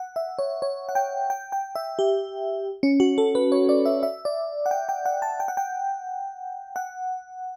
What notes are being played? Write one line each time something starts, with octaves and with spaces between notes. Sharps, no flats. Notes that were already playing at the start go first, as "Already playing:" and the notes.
Already playing: F#5
E5
C#5
C#5
F#5
G5
G5
G5
E5
G4
C#4
F#4
A4
B4
C#5
D5
E5
E5
D5
F#5
G5
G5
F#5
A5
G5
F#5
G5
F#5